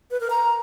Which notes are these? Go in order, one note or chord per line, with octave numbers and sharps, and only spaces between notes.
B4
A#4
A#5